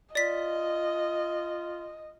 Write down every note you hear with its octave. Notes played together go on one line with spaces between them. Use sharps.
F4 D5 D#5 B6